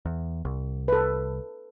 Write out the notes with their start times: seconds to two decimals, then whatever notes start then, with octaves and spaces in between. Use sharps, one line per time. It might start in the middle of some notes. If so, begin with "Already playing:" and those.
0.05 E2
0.45 C2
0.88 A4 B4